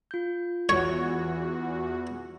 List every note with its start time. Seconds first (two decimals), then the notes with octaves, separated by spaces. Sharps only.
0.11 F4 G6
0.69 E2 F#4 C#5